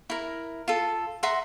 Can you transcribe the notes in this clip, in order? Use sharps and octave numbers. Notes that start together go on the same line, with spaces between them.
E4 A#4
F4 A4
E5 F#5 A#5 C6